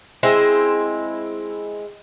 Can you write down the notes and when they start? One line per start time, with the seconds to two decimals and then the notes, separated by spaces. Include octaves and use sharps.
0.23 G#3 C4 E4